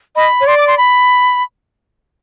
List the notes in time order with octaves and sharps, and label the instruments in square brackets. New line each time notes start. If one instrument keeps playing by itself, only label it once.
[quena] D#5 [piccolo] B5
[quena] C#5
[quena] D5 [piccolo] C6
[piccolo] D6
C6
B5